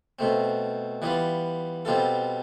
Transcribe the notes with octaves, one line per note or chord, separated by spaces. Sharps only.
B2 A3 C4
E3 G3 B3 F4
B2 G3 C4 F4 A4